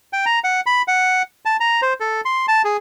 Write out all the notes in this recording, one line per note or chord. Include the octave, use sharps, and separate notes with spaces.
G5
A#5
F#5
B5
F#5
A5
A#5
C5
A4
C6
A5
G#4